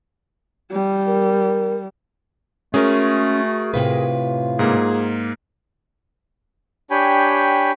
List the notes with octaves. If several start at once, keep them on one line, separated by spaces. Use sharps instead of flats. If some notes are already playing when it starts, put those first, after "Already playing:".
G3
A#4
G#3 A3 C#4 F#4 G#4 A#4
A2 C3 F4 B4
G#2 A#3 G#4
D4 G4 C#5 G5 G#5 B5